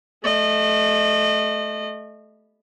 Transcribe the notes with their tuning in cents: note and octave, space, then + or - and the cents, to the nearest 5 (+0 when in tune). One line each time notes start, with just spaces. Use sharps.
A3 -20 D#5 -35